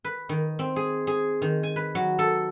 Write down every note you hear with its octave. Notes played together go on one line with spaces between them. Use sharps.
B4
D#3
C4
G#4
G#4
D#3
G#5
B4
F#3
A4